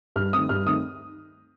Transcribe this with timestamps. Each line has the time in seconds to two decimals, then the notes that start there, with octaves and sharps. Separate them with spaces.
0.16 G2 F6
0.33 D#3 A3 C4 D#6
0.49 G2 F6
0.66 D#3 A3 C4 D#6